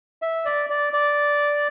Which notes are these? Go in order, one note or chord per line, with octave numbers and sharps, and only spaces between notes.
E5
D5
D5
D5